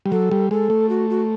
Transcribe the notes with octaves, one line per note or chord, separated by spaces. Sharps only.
G3
F#3 A4
G3
G#3 A4
A3
F#4
F#4